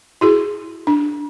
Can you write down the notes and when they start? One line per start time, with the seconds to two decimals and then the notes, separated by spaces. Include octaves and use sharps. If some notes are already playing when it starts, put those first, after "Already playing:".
0.21 E4 F#4 G#4
0.87 D4